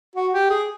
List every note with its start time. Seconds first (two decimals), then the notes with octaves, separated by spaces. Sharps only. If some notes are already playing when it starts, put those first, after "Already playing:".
0.15 F#4
0.33 G4
0.50 G#4